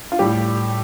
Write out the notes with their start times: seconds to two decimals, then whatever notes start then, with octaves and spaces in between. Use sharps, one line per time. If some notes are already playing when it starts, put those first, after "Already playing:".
0.12 F4
0.19 A2 G3 G4